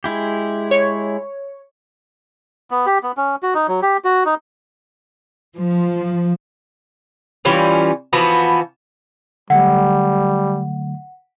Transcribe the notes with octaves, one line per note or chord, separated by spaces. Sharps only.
G#3 E4 G4
C#5
B3
G4
B3
C#4
F#4
D#4
F#3
G4
F#4
D#4
F3
E3 G3 C#4 F4
E3 F3 B3 F#4
D3 F#3 G3 A3 F#5